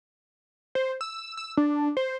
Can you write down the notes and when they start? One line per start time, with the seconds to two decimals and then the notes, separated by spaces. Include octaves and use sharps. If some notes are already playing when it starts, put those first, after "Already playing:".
0.75 C5
1.01 E6
1.37 E6
1.57 D4
1.97 C5